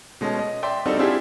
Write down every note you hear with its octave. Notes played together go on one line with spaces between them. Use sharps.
B2 G#3 A3 C#4
D#5
D5 E5 G5 C6
G3 C4 D4 D#4 F#4 A4
C4 D4 E4 F4 G4 G#4